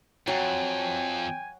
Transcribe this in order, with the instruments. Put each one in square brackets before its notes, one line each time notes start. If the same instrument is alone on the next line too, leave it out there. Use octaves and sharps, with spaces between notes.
[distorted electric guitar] F2 [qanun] F#3 [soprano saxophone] G5 [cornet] G#5